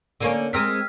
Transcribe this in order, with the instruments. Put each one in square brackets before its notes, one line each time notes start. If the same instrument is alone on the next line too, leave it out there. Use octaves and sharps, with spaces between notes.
[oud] D3 A#3 C#4
[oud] G#3 C4 A#4 [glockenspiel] E6 F6 B6